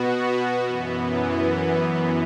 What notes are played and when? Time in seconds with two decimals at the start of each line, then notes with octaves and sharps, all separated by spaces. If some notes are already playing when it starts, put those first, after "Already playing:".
Already playing: B2 B3 F#4
0.64 F#2 E3 B3